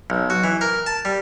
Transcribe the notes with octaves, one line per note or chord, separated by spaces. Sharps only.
B1
F#4
E3
A#4
A5
G3